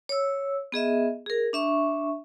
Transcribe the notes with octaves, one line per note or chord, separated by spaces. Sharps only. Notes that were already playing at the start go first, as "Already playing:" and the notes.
C#5 E6
B3 G#4 D#5 E5
G#4 A#4
D4 E5 C#6